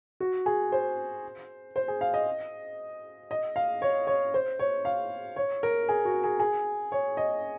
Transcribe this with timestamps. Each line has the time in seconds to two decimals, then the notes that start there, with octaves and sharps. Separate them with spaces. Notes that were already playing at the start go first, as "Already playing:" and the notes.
0.20 F#4
0.46 G#4
0.72 C5
1.76 C5
1.88 G#4
2.01 F5
2.14 D#5
3.31 D#5
3.56 F5
3.82 C#5
4.07 C#5
4.34 C5
4.59 C#5
4.85 F5
5.36 C#5
5.63 A#4
5.89 G#4
6.05 F#4
6.24 G#4
6.40 G#4
6.92 C#5
7.17 D#5